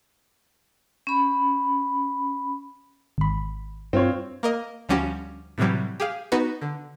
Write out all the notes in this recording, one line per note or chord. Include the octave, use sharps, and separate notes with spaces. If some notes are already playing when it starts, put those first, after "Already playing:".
C#4 B5
G#1 B5
G2 C4 F4 C#5
A#3 A#4 D#5
D2 F3 G3 C#4 F#4 G4
A2 C3 E3 F#3 G3
G4 G#4 F5
B3 D#4 F#4 B4
D3